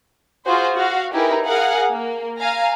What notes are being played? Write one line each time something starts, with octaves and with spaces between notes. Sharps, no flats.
F4 F#4 G#4 C5
F#4 F5 F#5
D#4 E4 G4 G#4 A#4 B4
G#4 A#4 F5 F#5
A#3
F5 G#5 A#5